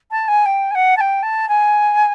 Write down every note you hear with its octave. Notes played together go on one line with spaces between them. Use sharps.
A5
G#5
G5
G#5
F#5
A5
G5
A5
G#5